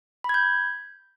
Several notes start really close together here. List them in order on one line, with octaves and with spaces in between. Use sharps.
B5 G#6 G6